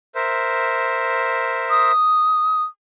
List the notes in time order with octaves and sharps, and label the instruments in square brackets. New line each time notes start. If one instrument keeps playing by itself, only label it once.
[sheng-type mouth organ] A#4 C5 E5
[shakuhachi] D#6